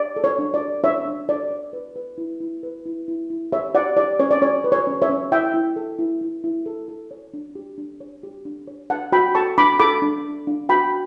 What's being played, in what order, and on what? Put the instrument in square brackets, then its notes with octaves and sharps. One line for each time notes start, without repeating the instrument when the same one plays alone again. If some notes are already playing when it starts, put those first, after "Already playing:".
Already playing: [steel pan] D5
A4
C#5
D4
D5
A4
D4 C#5 E5
D4
A4 D5
C#5
B4
B4
E4
E4
B4
E4
E4
E4
G4 C#5 E5
G4 D5 F#5
G4 D5
C#4 C#5
D5
C#4 C#5
B4
C#5
C#4
C#5 E5
C#4
E4 E5 G5
E4
A4
E4
E4
E4
A4
A4
C#5
D4
G4
D4
C#5
G4
D4
C#5
D4 F#5 A5
F#4 G5 B5
A4 A5 C#6
D4 B5 D6
A4 B5 D6
D4
A4
D4
F#4 G5 B5